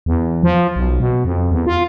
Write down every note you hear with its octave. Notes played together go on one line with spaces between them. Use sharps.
E2
F3
B1
B2
F2
E2
F4